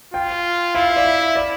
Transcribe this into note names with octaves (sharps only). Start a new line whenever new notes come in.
F4 G5
E4 F5
D5
E5
D5